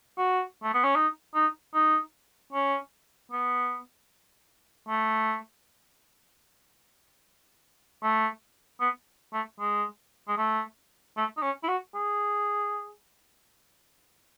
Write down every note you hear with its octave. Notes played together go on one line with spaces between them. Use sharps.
F#4
A3
B3
C#4
D#4
D#4
D#4
C#4
B3
A3
A3
B3
A3
G#3
G#3
A3
A3
D#4
C#4
E4
F#4
G#4